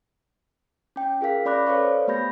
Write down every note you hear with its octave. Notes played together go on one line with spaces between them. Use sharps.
C#4 G5
F4 G#4 A#4 F5 B6
C#4 D5 B5 D6 F#6 A#6
A4 B4 C#5 D5 F5 C#6
C5
A3 B3 G4 B5 G6 A#6